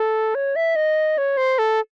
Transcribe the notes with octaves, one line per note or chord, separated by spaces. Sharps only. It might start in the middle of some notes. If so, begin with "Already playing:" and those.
Already playing: A4
C#5
E5
D#5
C#5
C5
A4